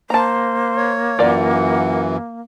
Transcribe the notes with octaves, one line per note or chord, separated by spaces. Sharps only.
A#3 C5 A5 A#5
C#5
F#2 E3 F4 A#4 D5 F#5